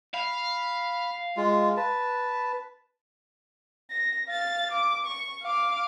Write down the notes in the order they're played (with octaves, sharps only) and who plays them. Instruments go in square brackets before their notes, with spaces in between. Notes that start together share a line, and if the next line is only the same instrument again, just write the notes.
[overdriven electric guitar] F5 [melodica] B5
[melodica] G#3 F4
B4 A5
[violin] A#6
F5 A6
D6
C#6
F5 D6